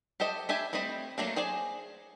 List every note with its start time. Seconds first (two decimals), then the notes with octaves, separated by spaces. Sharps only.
0.20 G4 A4 C5 D#5 E5
0.49 D4 G4 E5 G#5 B5
0.73 G3 A3 C4 D#5 B5
1.18 F#3 A3 A#3 D4
1.36 G#4 C5 D5 G#5